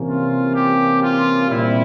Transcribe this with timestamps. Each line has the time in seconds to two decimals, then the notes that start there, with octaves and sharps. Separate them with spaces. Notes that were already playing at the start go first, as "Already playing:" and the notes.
Already playing: C3 E3 A#3 C#4
0.08 F4
0.55 G4
1.03 F4
1.49 A#2 G3 C4 E4